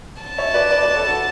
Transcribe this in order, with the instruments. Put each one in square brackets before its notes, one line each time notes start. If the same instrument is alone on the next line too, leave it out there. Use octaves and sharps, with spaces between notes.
[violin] A5
[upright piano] C#5 E5
B4 D5
B4 D5
B4 D5
A4 C#5
F#4 A4